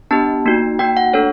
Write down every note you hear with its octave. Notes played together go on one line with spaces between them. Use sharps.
B3 D4 G4 A5
A#3 D#4 F#4
A#3 D#4 F#4 G5
F#5
A3 D4 F#4 A4 C#5